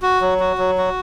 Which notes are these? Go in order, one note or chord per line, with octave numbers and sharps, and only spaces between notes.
F#4
F#3
F#4
F#3
F#4